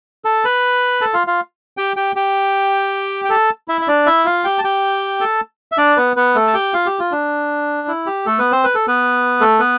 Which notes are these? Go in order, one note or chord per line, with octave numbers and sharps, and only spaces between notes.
A4 A5
B4 B5
A4 A5
F4 F5
F4 F5
G4 G5
G4 G5
G4 G5
G5
A4 A5
E4 E5
E5
D4 D5
E4 E5
F4 F5
G4 G5
A5
G4 G5
A4 A5
E5
D4 D5
B3 B4
B3 B4
A3 A4
A5
G4 G5
F4 F5
G4
F4
D4
E4
G4
A3 A4
B3 B4
C4 C5
B4
A4
B3 B4
A3 A4
B3 B4